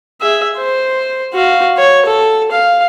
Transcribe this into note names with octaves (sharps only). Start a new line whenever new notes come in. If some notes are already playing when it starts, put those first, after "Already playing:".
G#4 E5
C5
F#4 F5
C#5
A4
F5